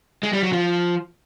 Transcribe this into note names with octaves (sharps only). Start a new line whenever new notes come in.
G#3
G3
F#3
F3